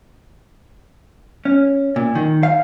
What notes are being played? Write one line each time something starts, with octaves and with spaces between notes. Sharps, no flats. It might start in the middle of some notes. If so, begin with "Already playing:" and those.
C#4
A#2
D#3
F5